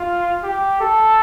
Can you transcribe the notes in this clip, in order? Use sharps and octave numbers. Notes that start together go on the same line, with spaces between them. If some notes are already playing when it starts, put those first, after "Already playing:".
Already playing: F4
G4
A4